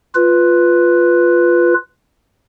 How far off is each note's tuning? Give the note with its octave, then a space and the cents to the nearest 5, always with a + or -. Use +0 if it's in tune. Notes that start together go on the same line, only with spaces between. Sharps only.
F4 +0 B4 +0